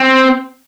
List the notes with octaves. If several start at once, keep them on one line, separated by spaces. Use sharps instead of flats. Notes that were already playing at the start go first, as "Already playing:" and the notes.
Already playing: C4